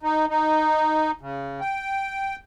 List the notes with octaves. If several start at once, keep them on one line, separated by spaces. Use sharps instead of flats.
D#4
D#4
C#3
G5